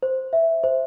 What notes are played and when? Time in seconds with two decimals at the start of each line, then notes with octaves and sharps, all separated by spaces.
0.03 C5
0.33 E5
0.64 C5